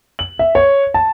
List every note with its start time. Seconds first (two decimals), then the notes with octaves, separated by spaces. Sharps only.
0.19 F#7
0.39 E5
0.55 C#5
0.94 A5